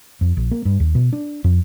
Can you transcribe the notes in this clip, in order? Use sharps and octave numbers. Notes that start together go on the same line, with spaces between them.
F2
A#1
A#3
G2
D#2
B2
D4
F2